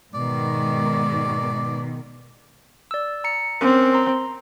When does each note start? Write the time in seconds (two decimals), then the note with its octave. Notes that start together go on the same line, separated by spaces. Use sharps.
0.14 G#2 B2 D#3 D5
2.91 D5 E6
3.24 A#5 C#7
3.61 C4 C#4 A#4
3.94 A#5 C6